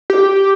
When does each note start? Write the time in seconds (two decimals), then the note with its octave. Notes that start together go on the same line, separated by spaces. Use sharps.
0.10 G4